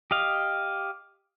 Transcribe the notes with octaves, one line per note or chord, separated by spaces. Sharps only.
G4 D#5 F5